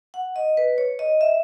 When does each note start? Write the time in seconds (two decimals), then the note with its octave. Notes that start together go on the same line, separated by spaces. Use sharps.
0.14 F#5
0.36 D#5
0.57 B4
0.78 C#5
0.99 D#5
1.21 E5